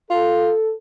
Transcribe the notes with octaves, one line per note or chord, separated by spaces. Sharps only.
F4 A4